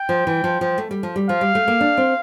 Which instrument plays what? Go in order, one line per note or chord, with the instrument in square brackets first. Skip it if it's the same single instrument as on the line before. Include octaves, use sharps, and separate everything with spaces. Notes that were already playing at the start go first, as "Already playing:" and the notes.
Already playing: [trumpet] G5
[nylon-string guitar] F3
E3
F3
F3
A3
G3
F3
G3
[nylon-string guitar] F3 [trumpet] F5
[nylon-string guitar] G3
A3
A#3
D4
C4